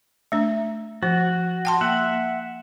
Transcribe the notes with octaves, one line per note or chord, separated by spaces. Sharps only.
A3 D4
F3 F#4
G5 A5 C6
A#3 E5 F#5